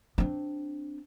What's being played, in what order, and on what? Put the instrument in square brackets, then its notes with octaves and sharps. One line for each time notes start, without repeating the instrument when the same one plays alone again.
[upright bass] C4 D4